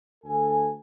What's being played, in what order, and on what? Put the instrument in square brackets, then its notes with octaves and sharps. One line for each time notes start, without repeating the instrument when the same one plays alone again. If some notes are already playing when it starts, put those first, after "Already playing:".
[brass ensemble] D2 A4 G#5